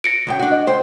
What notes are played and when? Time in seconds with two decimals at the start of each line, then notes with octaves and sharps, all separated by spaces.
0.04 A#6 C#7 D7
0.27 C#2 F#2 G5
0.39 D4 F#4
0.51 D#5
0.67 C#2 C5 G5